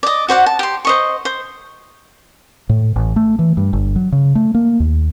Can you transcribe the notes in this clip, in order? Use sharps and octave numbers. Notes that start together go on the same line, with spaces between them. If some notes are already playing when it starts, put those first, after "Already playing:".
D5 D#5
F#4 C5 D5 F#5
A5
G4 C6
C5 D#5 C#6
C5
A2
A1
A3
E3
G2
G1
F#3
C#3
A3
A#3
D#2